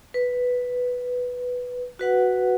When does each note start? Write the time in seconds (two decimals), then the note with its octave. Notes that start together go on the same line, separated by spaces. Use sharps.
0.14 B4
1.99 F#4 B4 F#5